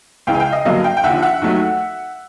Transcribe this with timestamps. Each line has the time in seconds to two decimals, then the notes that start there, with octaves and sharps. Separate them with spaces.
0.27 C#2 C#3 E3 F5 G5
0.34 G#5
0.40 F5 G5
0.52 D#5 F5
0.65 G2 D3 F#3 A#3 D#5 F5
0.84 F5 G5
0.97 G5
1.04 D#2 D3 F3 E5 F#5
1.22 E5 F#5
1.42 D#2 D#3 F#3 A3